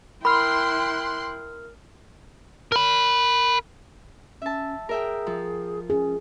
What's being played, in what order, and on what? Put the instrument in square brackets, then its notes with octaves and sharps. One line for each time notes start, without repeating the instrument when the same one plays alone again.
[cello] E4 G5 [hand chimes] A#4 F6 [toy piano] B5 [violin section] C6 F#6
[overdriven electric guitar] A#4 B5
[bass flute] C#4 [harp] E5 A5
[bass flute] G#4 [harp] A#4 E5 G5
[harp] F3
[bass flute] C#4 [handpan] G#4